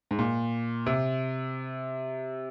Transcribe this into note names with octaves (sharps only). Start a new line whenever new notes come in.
G#2
A#2
C3